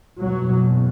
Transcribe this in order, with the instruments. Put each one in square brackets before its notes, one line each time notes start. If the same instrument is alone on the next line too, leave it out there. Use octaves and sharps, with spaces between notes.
[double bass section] F#1 E2 B2 F#3